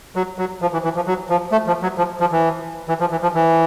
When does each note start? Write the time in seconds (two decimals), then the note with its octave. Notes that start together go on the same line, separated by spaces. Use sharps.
0.16 F#3
0.38 F#3
0.62 F3
0.73 E3
0.84 E3
0.96 F3
1.07 F#3
1.30 F3
1.52 A3
1.67 F3
1.83 F#3
1.98 F3
2.21 F3
2.32 E3
2.89 E3
3.00 F3
3.11 E3
3.23 F3
3.35 E3